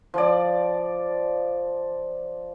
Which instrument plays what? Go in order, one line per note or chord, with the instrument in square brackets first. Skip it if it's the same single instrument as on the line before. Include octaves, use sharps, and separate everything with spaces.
[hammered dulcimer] F3 D5